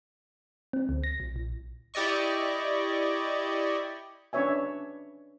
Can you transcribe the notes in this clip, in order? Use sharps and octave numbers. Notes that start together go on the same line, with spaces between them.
C4
D2
A#6
B1
A#1
E4 G4 D5 D#5 C#6
C#4 D4 B4 C#5 E5 G#5